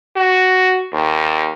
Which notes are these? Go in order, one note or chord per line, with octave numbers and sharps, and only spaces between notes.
F#4
D#2